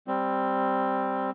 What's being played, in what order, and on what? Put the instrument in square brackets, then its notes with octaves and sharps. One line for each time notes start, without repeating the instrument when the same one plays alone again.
[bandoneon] G3 C4